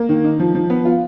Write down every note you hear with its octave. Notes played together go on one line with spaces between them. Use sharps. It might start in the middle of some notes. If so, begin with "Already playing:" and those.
Already playing: A#3
D#3
D#4
F3
F3
B3
F4